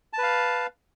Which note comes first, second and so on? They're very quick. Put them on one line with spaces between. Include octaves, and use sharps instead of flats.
A5 B4 F5